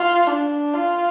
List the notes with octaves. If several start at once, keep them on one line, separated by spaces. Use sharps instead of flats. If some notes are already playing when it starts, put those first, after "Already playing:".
Already playing: F4
D4
F4